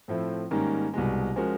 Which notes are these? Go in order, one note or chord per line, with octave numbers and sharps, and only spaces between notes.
A2 F3 A3 C4 E4
G#2 D#3 G3 A#3 C#4
C2 B2 G#3
F3 G#3 C#4 F#4 A#4